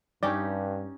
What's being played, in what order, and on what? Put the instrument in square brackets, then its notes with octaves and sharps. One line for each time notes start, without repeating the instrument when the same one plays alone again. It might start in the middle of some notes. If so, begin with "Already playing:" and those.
[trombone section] G2 [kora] C#4 D#4 G4 [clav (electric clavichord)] D5